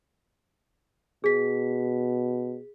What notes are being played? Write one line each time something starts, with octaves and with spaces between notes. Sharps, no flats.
B2 G#4 B6